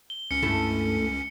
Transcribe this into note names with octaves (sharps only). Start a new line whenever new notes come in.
G7
C#2 C#4 C#7
G2 A3 E4